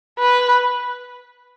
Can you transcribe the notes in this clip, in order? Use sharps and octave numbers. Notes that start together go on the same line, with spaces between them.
B4